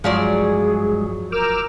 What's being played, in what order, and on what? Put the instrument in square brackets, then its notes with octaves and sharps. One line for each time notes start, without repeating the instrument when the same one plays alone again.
[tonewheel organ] G2 G#3 [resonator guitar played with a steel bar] F3 F#3 D5 [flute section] G#4
[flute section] A#4 G6 [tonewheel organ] D6 E6 F6